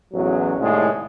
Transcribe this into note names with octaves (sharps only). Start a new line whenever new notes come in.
A1 E2 F#3
C2 A2 D#3 G#3